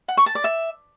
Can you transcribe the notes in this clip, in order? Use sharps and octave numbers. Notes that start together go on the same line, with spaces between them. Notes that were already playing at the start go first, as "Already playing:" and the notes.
F#5
C#6
A5
D5
E5